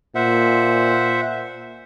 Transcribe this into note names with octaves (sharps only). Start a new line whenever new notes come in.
A#2 C5 E5 F#5